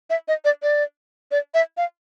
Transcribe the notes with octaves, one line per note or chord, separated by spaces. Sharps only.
E5
D#5
D5
D5
D5
E5
F5